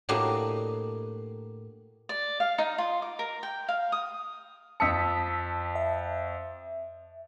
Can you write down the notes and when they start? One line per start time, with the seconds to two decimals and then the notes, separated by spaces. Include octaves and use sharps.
0.09 A2 A#3 D4 D#4 F#4 G4
2.09 D5
2.40 F5
2.58 D#4
2.78 F4
3.02 D6
3.19 A#4
3.43 G5
3.68 F5
3.92 D#6
4.80 F2 A5 D#6 E6 B6 C#7
5.75 E5